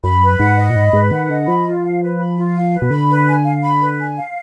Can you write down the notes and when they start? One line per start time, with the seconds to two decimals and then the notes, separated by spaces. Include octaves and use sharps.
0.03 F#2 B5
0.22 B4
0.40 G#2 F#5
0.57 D#5
0.70 A#2
0.75 G#2 B5
0.93 G#2 B4
1.11 D#3 F#5
1.29 D3 D#5
1.47 F3 B5
1.65 F4
1.83 F5
2.01 B4
2.19 B5
2.38 F4
2.55 F5
2.73 B4
2.82 B2
2.91 D3 B5
3.09 B4
3.28 G#5
3.45 F5
3.62 B5
3.81 B4
3.99 G#5
4.17 F5